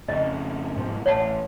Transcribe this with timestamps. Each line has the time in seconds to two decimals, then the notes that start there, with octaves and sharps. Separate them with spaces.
0.08 F2 C#3 D#5
0.76 G#2 B2 F3
1.06 A1 C#5 F#5 A5